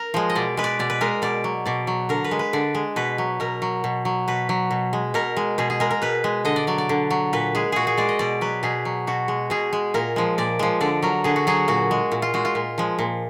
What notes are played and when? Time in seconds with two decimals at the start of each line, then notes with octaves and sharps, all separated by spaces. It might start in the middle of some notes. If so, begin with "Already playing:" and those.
Already playing: A#4
0.14 F3 G#3
0.30 D#5
0.35 B2 D5
0.57 G#3 B4
0.64 D5
0.79 B2 D5
0.90 B4
1.01 G#3 A#4
1.22 B2 D5
1.44 F#3
1.65 B2 D5
1.87 F#3
2.09 D3 A#4
2.24 B4
2.31 G#3
2.39 B4
2.53 D3 D5
2.75 G#3
2.96 B2 B4
3.18 F#3
3.40 B2 A#4
3.62 F#3
3.84 B2
4.05 F#3
4.28 B2 B4
4.49 F#3
4.71 B2
4.93 G#3
5.14 B2 A#4
5.37 G#3
5.58 B2 G#4
5.70 G#4
5.80 G#3 A#4
5.91 A#4
6.02 B2 B4
6.24 G#3
6.45 D3 D#5
6.56 D5
6.67 F#3 D5
6.78 D5
6.89 D3
7.10 F#3
7.33 A#2 B4
7.55 G#3 G#4
7.72 A#2 F#4 G#4
7.87 G#4
7.97 G#3 D5
8.09 D#5
8.19 B2 D5
8.41 F#3 B4
8.63 B2 G#4
8.85 F#3
9.07 B2 F#4
9.28 G#3
9.50 B2 G#4
9.73 G#3
9.94 A#2 A#4
10.16 F3 G#3
10.38 A#2 D5
10.59 F3 G#3
10.81 D3 D5
11.02 F#3 A#4
11.24 D3 G#4
11.36 F#4
11.47 F#3 G#4
11.68 A#2 F#4
11.91 G#3
12.12 A#2
12.22 F4
12.34 G#3 F#4
12.45 F4
12.55 A#2
12.78 F3 G#3
12.99 A#2